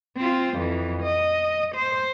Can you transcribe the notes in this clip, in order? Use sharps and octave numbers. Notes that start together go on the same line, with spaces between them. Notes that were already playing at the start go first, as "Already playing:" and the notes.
C4 F4
F2 E3
D#5
C5